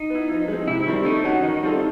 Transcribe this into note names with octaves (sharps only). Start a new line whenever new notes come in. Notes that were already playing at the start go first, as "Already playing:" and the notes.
Already playing: D#4
B3 E4
F3
G#3 C4
C3 E4
E4
D#3 G3 C4
A3 D#4
C#4 F#4
D#3
G3 C4 F4 A4